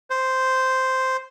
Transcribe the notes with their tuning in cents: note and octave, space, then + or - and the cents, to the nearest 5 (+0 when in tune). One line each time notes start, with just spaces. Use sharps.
C5 -5